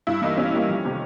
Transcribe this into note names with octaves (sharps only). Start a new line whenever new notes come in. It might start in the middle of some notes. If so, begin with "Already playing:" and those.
G2 E4
E3 G3 A#3 D#4
G2 C#4
E3 G3 A#3
F2
C3 D#3